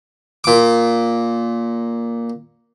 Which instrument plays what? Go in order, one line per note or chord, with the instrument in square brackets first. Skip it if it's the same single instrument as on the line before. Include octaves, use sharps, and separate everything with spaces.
[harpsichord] A#2 D6